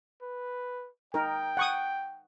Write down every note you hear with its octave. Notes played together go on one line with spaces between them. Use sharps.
B4
D#4 A#4 G5
F#5 C#6 D#6